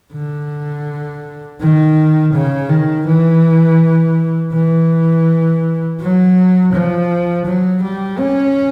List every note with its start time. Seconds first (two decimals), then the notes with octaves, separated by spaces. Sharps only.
0.13 D3
1.60 D#3
2.33 C#3
2.69 D#3
3.06 E3
4.52 E3
6.00 F#3
6.72 F3
7.45 F#3
7.82 G3
8.19 C#4